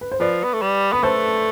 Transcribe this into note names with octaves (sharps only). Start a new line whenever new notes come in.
B4
C5
F3 B4 D5
B3
A3
G3
B3 B4
A3 A4 C5